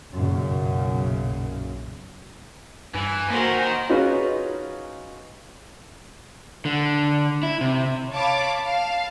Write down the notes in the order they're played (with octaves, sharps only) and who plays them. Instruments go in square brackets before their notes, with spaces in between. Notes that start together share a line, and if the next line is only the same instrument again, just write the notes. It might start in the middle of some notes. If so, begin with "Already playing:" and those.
[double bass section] B1 F#2 A#2 C#3
[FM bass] G2 [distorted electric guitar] E3 [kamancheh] G#5
[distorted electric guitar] D#3 [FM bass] A#3 [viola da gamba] F#4 A#4 C5
[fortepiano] C#4 D#4 F4 F#4 G#4 B4
[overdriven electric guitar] D3
E4
C3
[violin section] C#5 F5 A5 B5 D6
F5 A5